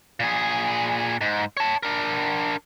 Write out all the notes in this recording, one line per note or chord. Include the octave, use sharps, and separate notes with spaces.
A#2 G#4
G#2
C#5 A5
D4 A#4